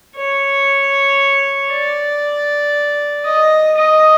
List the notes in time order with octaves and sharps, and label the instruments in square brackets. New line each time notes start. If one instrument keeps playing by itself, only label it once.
[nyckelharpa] C#5
D5
D#5
D#5